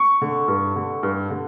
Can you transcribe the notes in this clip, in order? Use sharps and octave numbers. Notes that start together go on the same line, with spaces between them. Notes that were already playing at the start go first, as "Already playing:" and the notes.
Already playing: C#6
D3
G2
D3
G2
D3